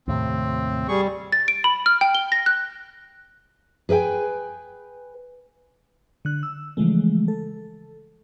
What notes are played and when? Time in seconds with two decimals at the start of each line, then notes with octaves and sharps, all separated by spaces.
0.08 D#2 A2 C3 C4
0.88 G3 G#4 C#6
1.32 A6
1.48 D7
1.64 B5
1.86 F6
2.01 G5
2.15 G7
2.32 A#6
2.46 F#6
3.89 G#4 B4 E5 G5 G#5
6.25 D3 F#6
6.43 E6
6.77 C#3 E3 F3 G#3 A3
7.28 A4